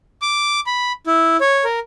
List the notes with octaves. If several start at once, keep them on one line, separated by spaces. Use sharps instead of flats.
D6
B5
E4
C#5
A#4